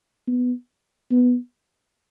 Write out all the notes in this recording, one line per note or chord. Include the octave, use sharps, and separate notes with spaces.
B3
B3